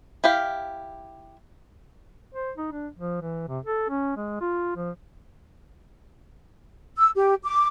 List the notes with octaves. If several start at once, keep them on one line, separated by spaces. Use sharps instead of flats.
E4 G4 F5
C5
D#4
D4
F3
E3
C3
A4
C#4
G#3
F4
F3
E6
G4
D6